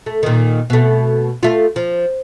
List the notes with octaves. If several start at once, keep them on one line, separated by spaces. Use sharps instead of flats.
A3
A#2 D#3
B2 A3
A3 F4
F3